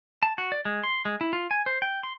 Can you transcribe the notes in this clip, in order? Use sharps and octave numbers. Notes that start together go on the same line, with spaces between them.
A5
F#4
D5
G#3
C6
G#3
E4
F4
G#5
C5
G5
C6